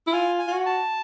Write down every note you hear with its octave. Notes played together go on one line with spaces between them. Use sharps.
E4
F4 G#5
G#5
F4
F#4
A5